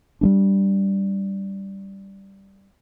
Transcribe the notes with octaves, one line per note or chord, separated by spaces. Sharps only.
G3 A3 D4